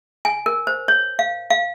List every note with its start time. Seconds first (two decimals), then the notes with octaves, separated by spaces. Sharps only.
0.25 G#5
0.46 A#4
0.67 C5
0.88 C#5
1.19 F5
1.50 F5